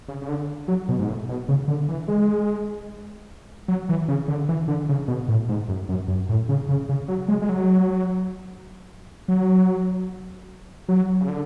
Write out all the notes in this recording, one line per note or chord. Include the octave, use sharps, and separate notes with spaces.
C#3
C#3
D3
F#3
B2
G#2
A2
B2
C#3
D3
E3
G#3
F#3
E3
C#3
D3
E3
D3
C#3
B2
A2
G#2
F#2
F#2
F#2
A2
C#3
C#3
C#3
F#3
G#3
G#3
F#3
F#3
F#3
C#3
D3